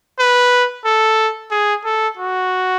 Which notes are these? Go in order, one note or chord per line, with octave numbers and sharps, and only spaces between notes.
B4
A4
G#4
A4
F#4